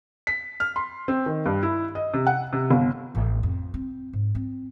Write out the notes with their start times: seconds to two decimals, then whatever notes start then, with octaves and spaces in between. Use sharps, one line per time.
0.27 B6
0.60 F6
0.76 C6
1.08 C4
1.26 D#3
1.46 G2
1.63 E4
1.95 D#5
2.14 C3
2.27 F#5
2.53 C3
2.71 G1
3.15 A1
3.43 F2
3.74 C4
4.13 G#2
4.35 C4